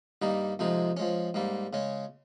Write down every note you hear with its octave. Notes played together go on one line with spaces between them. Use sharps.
G2 D#3 G3 A#3 D#4
F2 C3 F3 G#3 D#4
F3 G#3 C#4
G#2 G3 A#3
C#3 G#3 C#4